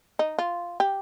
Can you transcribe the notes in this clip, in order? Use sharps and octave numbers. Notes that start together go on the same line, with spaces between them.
D#4
F4
G4